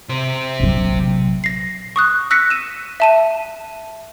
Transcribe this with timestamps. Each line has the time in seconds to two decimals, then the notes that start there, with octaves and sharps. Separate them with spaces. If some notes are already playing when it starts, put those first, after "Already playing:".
0.09 C3 C5
0.60 A#1 F#3
1.44 A#6 C7
1.96 C#6 D#6 F#6
2.30 E6 F#6 A#6 B6 C#7
2.50 D#7 E7
3.00 E5 A5 D#7